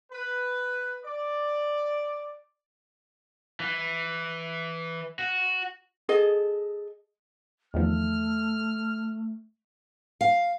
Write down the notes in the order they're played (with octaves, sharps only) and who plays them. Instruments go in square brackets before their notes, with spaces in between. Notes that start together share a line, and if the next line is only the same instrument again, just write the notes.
[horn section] B4
D5
[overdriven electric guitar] E3
F#4
[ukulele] G#4 A4 D#5
[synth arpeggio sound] E2 D#3 F3 [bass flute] A3 [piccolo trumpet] F6
[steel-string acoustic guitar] F5